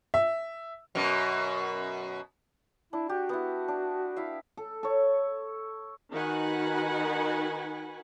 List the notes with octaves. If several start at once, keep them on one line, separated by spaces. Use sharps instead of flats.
E5
F#2 B2
D4 E4
F#4 G4
B3 E4
D4
E4 E5 F5
A4
A4 C#5
D#3 D#4 F#4 B4 F#5 G#5